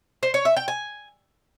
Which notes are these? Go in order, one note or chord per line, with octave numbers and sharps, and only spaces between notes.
C5
C#5
E5
G5
G#5